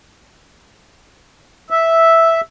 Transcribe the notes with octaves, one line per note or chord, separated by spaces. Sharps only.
E5